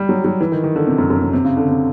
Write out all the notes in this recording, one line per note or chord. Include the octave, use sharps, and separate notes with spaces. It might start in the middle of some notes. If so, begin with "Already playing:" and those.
Already playing: G3
F#3
F#3
E3
D#3
D#3
D3
C3
F#2
F#2
C3
C3
C#3
D3
C3